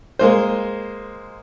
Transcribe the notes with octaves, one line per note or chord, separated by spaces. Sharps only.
G#3 A#3 C5